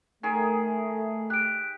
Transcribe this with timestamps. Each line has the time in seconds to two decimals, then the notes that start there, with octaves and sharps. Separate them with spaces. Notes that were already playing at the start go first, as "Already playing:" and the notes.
0.23 D#3 A3 G#4 G#5
1.30 G4 F#6 D7